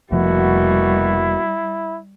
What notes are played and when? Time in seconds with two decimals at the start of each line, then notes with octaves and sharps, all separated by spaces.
0.12 F1 B2 F3 G3 A3 A#3 E4 F#4